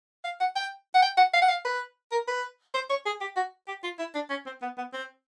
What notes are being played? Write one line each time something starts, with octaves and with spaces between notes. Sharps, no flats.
F5
F#5
G5
F#5
G5
F#5
F5
F#5
F5
B4
A#4
B4
C5
C#5
G#4
G4
F#4
G4
F4
E4
D4
C#4
C4
B3
B3
C4